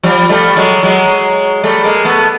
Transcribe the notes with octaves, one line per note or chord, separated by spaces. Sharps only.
F3 G3
G3 A3
F#3 G#3
F#3 G#3
G3 A3
G#3 A#3
A3 B3